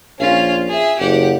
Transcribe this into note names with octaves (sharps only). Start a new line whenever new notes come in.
A#1 C#4 F4
G#4 E5
F#1 G4 F#5